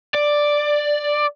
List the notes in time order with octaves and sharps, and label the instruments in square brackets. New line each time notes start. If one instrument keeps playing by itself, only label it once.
[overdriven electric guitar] D5